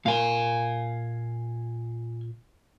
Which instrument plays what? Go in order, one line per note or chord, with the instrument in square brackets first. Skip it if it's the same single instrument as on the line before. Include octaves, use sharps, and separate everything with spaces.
[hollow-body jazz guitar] A#2 A#3 [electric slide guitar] F5 G#5